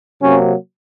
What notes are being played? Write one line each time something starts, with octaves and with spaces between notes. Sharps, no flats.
C3 F#3 A#3 C#4